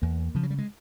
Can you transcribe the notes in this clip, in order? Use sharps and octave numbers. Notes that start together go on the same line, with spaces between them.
E2 A#3
C#3 F3
F#3
G3
G#3